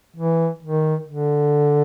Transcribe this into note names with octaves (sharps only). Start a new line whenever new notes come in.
E3
D#3
D3